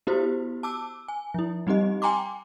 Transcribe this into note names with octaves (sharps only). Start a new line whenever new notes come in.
B3 E4 F#4 G4 C5
A5 D6 E6
G#5
F3 E4
G3 C4 D#4 G4 D#5
G5 G#5 A#5 C6 D6